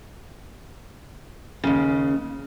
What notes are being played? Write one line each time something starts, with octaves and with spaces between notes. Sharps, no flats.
D#2 C#3